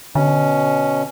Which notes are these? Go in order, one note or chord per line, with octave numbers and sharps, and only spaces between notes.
B2 D3 C#4